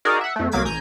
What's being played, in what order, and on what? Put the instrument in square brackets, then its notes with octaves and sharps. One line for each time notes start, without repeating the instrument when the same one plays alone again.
[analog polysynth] D#4 F#4 G#4 A#4 D5
E5 F#5
F2 A3
C2 F#3 A#3 D6 G#6 B6
A1 G#5 A#5 G6